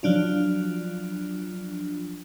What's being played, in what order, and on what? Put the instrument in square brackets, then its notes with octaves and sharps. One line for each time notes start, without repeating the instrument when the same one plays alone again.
[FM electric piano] F3 F#3 D4 F4